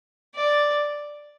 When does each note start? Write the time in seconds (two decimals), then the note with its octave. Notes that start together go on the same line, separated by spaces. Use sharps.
0.35 D5